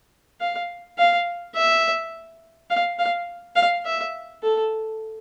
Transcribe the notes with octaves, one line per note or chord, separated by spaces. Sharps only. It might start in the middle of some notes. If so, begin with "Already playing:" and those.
F5
F5
E5
F5
F5
F5
E5
A4